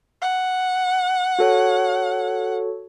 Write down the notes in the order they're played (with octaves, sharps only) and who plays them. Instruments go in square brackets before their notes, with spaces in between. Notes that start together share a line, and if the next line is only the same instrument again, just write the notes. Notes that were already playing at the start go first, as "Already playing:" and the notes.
[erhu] F#5
[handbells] F#4 A4 C#5